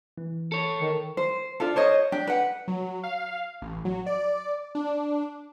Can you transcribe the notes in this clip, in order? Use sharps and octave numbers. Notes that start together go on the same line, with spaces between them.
E3
A4 C#5
D#3
C5
D4 F4 A4
C5 C#5 D#5
D4 G4
B4 F#5
F#3
F5
A1
F#3
D5
D4